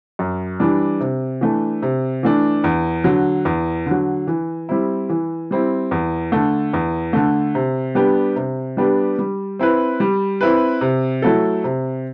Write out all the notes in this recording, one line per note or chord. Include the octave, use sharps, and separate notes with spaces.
F#2
E3 G3 D4
C3
E3 A3 D4
C3
E3 A3 D4
E2
D3 F#3
E2
D3 F#3
E3
G3 C4 E4
E3
G3 C4 E4
E2
D3 A3
E2
D3 A3
C3
G3 B3 D4 G4
C3
G3 B3 D4 G4
G3
C4 E4 B4
G3
C4 E4 B4
C3
F#3 A3 E4 A4
C3